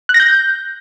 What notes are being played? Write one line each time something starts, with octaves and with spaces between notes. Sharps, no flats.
F#6
A#6
G6